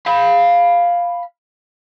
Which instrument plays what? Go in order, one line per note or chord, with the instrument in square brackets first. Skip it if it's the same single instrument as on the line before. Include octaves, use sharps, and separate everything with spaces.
[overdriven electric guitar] F5 B5